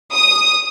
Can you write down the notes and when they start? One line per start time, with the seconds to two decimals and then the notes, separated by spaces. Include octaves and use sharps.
0.13 D#6